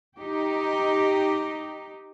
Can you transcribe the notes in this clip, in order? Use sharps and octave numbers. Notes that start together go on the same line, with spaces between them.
D#4 G4